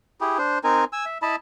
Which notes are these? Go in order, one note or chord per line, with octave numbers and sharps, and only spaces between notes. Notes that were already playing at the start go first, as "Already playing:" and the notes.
E4 G4 G#4
D4 C5
C4 D#4 A#4 G#5
G#5 E6
E5
E4 D#5 A5 B5